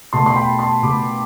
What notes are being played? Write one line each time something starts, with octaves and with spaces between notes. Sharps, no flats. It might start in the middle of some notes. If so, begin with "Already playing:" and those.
B2 A3 A5 C6
C6
G5 B5
A5 C6
B2 A3 B5 D6